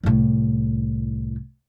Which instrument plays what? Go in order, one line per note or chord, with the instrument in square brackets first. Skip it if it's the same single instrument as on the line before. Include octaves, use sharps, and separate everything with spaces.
[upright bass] C2 A2